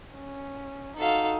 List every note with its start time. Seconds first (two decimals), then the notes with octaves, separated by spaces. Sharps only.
0.15 C#4
0.97 D#4 F#4 A4 F5